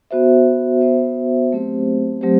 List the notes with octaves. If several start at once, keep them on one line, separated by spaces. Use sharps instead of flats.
B3 F#4 C5 E5
B3 F#4 C5 E5
F#3 A3 C4 G4 C5
F#3 A3 C4 G4 C5